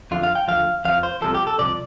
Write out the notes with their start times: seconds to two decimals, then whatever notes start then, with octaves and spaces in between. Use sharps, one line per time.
0.11 F2 D3 F3 F4
0.23 F5
0.35 G5
0.48 D2 D3 F3 F5
0.85 F2 F3 F5
1.03 C5
1.22 C2 C3 F3 A4
1.34 G4
1.47 A4
1.58 C2 C3 F3 D5